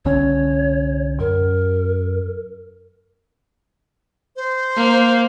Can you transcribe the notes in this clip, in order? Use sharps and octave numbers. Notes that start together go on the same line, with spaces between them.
C2 D3 C#4 C#5
F#2 A#4
C5
A#3